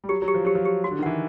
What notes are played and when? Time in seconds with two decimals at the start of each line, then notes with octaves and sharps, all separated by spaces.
0.04 G3
0.09 F#3 G4
0.22 F#3
0.28 G4
0.35 F3
0.45 F#3 G4
0.55 F3
0.65 G4
0.84 F#4
0.91 D3
0.99 D#3
1.03 E3 F#5